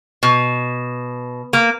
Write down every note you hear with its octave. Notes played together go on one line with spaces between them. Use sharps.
B2
A#3